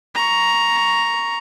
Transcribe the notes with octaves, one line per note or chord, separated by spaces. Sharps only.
A#5 C#6